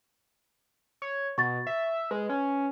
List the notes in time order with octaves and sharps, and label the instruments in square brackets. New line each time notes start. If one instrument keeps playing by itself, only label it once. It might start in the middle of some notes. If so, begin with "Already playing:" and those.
[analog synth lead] C#5
[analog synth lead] B2 [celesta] C#6 A6
[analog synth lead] E5
[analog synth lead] G#3 [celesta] B4
[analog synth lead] C#4